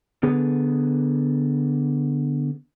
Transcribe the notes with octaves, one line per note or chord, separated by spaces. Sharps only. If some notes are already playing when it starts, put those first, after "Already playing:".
D3 B3 G#4 B4